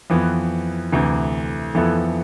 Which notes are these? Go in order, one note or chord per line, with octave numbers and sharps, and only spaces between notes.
F2 E3 B3
D2 C3 E3
F2 E3 B3 E4 A4